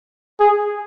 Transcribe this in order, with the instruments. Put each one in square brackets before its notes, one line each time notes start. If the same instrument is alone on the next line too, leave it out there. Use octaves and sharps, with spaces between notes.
[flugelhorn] G#4